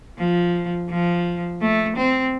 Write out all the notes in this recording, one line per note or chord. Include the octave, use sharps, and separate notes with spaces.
F3
F3
A3
C4